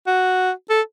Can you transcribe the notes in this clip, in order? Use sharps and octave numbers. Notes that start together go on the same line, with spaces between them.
F#4
A4